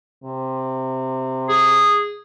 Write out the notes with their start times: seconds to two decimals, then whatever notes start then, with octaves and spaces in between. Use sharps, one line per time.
0.24 C3
1.49 G#4